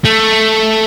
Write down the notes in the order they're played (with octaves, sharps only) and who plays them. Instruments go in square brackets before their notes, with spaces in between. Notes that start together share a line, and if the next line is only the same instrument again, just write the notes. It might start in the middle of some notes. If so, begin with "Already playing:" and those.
[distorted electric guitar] A3